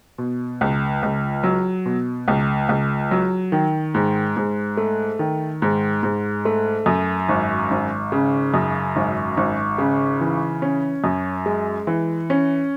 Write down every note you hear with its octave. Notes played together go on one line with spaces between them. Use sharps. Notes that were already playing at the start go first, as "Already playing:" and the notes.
B2
C#2
C#2
F#3
B2
C#2
C#2
F#3
D#3
G#2
G#2
A3
D#3
G#2
G#2
A3
F#2
G#1
G#1
C#3
F#2
G#1
G#1
C#3
E3
C#4
F#2
G#3
E3
C#4